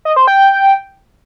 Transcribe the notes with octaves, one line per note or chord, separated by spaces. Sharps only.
D#5
C5
G5